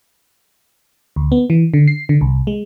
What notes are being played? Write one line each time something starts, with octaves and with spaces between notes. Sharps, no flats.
D2
B3
E3
D3
C7
D3
C2
G#3